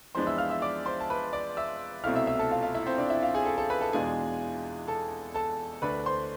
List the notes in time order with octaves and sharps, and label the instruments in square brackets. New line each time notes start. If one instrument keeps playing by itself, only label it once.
[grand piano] F2 E3 G#3 B3 D4 C5 C6
E5 E6
F5 F6
E5 E6
D5 D6
C5 C6
A5
B4 B5
D5 D6
E5 E6
C2 B2 A3 C4 E4 F5 F6
E5 E6
E5 E6
A4 A5
F4 F5
F4 F5
E4 E5
C4 C5
D4 D5
E4 E5
F4 F5
G#4 G#5
A4 A5
A4 A5
B4 B5
A4 A5
E2 B2 G#3 D4 F4 G#4 G#5
A4 A5
A4 A5
D2 D3 A3 D4 B4 B5
C5 C6